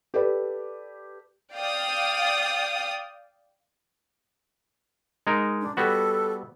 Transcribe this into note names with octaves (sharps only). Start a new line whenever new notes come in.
G4 A4 B4 D5
D5 F5 G5 D#6
G#3 D#4 A#4
D4
G3 B3 F#4 A4